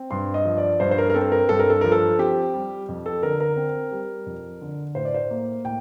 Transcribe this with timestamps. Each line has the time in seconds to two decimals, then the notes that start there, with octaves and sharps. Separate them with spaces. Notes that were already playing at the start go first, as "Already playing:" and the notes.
Already playing: C4
0.11 G2 C6
0.34 D#5
0.45 F3
0.58 D5
0.80 G2 C5
0.91 C5
0.98 A#4
1.10 A#4
1.14 C4 A4
1.32 A#4
1.49 G2 A4
1.59 A#4
1.70 A4
1.81 F3 A#4
1.92 A4
2.19 C4 G4
2.54 G3
2.88 F2
3.06 A4
3.23 D3 A#4
3.40 A#4
3.57 C4
3.92 G3
4.26 F2
4.61 D3
4.95 A2 C5
5.05 D5
5.14 C5
5.31 A#3
5.64 A2 G5